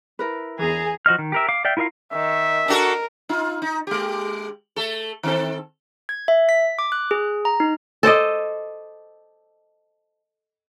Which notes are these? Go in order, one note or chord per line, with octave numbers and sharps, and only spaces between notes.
E4 A#4 B4
E2 E3 G#4 G#5 A#5
F3 F#4 D#5 F6
D#3
G4 A#4 E5
F5 D6
D5 E5 F5 G5
E4 F4 A#4 D#5 F5
D#3 E5
D4 F#4 A4 A#4
D#4 F4
D#4
G#3 G4
A3 A4
D#3 C4 A4
G#6
E5
B6
D6
F#6
G#4
A#5
D#4
A4 C5 D5 D#5